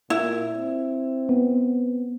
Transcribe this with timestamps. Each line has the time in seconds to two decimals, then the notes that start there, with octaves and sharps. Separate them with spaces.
0.10 A#2 E4
0.52 C4
1.29 B3